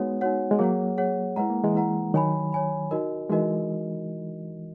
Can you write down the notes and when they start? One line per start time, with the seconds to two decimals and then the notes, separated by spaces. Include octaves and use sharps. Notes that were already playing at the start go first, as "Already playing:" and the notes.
Already playing: G#3 B3 D#4 F#4 C#5 F#5
0.21 D#4 F#4 C#5 F#5
0.51 G#3
0.59 F#3 A#3 G#4 C#5 F#5
0.98 G#4 C#5 F#5
1.36 G#3 E4 B4 F#5 A#5
1.50 A#3
1.64 E3 G#3
1.75 E4 B4 F#5 A#5
2.14 D#3 F#3 C#5 G#5 B5
2.53 C#5 G#5 B5
2.91 D#4 F#4 A#4 D#5
3.30 E3 G#3 D#4 F#4 A#4 D#5